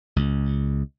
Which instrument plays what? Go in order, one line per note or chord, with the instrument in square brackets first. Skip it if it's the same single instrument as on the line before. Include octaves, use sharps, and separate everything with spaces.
[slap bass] C#2